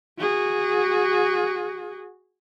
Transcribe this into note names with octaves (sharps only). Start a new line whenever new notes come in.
F#4 G#4